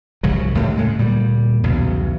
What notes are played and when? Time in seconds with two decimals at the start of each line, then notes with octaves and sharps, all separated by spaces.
0.23 C2 G#2 C#3 F#3
0.55 D#2 A2 C#3
0.77 A2 C#3 G#3
0.98 D2 A#2 G3
1.64 B1 E2 G2 C#3